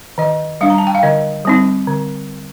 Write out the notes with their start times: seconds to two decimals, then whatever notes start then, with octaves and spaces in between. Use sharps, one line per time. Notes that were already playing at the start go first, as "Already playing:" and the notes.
0.18 D#3 D#5
0.61 G3 D4 F5
0.70 A#5
0.78 A5
0.87 G5
0.95 F5
1.03 D3 D#5
1.45 G3 C4 D#4
1.87 D3